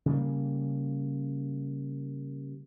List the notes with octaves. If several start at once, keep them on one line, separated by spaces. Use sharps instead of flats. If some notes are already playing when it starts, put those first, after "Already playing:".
C#3 G3 A#3